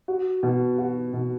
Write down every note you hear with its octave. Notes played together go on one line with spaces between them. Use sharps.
F#4
B2
F#4
B2